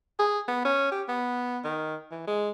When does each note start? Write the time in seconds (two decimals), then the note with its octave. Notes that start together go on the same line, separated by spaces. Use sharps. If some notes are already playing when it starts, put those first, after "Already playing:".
0.19 G#4
0.48 B3
0.65 C#4
0.92 G4
1.08 B3
1.64 D#3
2.11 E3
2.27 G#3